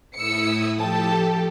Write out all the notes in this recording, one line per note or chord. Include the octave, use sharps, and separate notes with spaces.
A2 E4 D#6 E6 C#7
F3 G4 A4 G5 A5